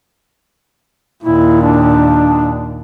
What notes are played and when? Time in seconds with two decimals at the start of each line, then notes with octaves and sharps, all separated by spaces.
1.24 D#2 A#2 E4
1.62 D4